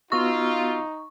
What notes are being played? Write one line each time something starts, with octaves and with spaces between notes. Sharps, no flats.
B3 D#4 F4 F#4 C#6 E6